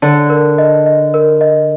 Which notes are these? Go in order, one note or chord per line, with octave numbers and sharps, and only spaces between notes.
D3 A5
A#4
D#5
D#5
A#4
D#5